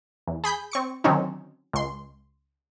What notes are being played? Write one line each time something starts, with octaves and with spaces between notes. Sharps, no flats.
E2
G#4 B5 G6 B6
C4 C#6 C#7
D3 D#3 F#3 C4 C#4 D#4
C#2 C6